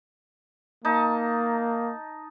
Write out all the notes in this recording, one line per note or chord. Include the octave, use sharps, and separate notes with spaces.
A#3 D#4 A5